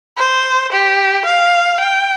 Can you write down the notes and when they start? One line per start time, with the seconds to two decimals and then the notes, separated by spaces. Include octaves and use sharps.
0.17 C5
0.72 G4
1.25 F5
1.80 G5